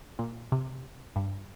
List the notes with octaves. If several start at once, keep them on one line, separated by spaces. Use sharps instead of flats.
A#2
C3
G2